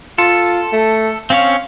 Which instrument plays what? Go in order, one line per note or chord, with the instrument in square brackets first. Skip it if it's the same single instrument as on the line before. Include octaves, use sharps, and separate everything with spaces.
[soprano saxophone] F4 [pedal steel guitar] A4
[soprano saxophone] A3
[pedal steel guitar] C4 C#4 C#5 [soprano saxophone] F5